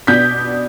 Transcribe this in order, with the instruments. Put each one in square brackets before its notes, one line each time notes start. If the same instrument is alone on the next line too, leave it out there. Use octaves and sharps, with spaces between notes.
[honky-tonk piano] B2 B3 D4 G6 B6